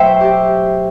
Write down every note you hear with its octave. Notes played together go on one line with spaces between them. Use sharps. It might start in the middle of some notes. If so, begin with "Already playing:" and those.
Already playing: B2 F#3 A3 C5 E5 G5
G4